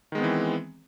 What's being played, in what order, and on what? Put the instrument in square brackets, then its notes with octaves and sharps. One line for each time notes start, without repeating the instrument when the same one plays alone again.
[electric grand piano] D#3
G#3
B3
C4
E3